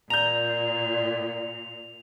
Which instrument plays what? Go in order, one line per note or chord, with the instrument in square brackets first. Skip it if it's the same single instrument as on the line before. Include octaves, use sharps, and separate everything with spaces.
[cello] A#2 [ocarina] D5 [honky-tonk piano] A#5 G6 [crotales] F7